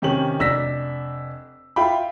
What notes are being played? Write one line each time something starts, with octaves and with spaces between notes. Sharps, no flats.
C3 D#3 C#4 G4 F#7
F1 D4 E6 A#6 B6
F4 E5 F5 G5 B5